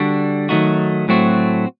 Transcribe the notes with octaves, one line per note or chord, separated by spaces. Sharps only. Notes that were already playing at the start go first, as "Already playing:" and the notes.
Already playing: D3 G3 D4 F#4
D#3 F#3 A3 D#4 F#4
A2 F#3 A3 C4 F#4